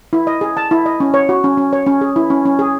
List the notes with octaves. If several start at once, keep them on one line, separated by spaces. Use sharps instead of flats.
E4
D#5
G#4
A5
E4
D#5
C#4
C#5
F#4
C#4
C#4
C#5
C#4
G#4
E4
C#4
C#4
G#4